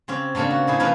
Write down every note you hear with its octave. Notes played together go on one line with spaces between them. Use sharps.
C#3 C4 C#4 G4
C#3 A3 A#3 C4 D4
F#4
D#4 E4 G#4
C#3 F3 A#3 D#4 B4